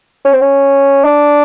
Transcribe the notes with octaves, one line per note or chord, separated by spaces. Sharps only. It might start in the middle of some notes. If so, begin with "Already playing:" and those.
C#4
C4
C#4
D4